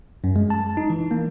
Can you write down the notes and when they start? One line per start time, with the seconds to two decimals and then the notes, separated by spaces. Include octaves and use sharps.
0.24 F#2
0.36 G#3
0.50 A5
0.77 D#4
0.90 E3
1.11 A#3